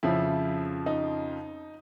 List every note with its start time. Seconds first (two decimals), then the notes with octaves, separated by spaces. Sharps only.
0.03 F2 C#3 F3 E4
0.86 D#4